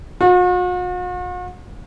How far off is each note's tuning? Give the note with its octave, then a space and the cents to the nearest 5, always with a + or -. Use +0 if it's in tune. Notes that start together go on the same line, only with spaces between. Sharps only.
F#4 -45